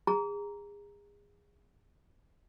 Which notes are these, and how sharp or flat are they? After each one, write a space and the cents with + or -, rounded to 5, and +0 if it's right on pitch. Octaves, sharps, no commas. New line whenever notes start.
G#4 -30 A#5 +0